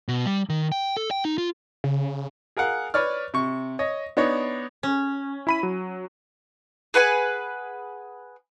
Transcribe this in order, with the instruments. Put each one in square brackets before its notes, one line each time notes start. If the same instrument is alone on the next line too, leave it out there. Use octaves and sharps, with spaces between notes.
[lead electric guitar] B2
G3
D#3
G5
A4
G5
D#4
F4
[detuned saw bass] C#3
[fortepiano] G#4 A#4 F5 F#5
B4 C#5 D5 F6
C3 C#6
C#5 D#5
B3 D4 D#4 C#5
[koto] C#4
[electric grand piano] E4 B5 D#7
F#3
[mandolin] G#4 B4 F#5 G#5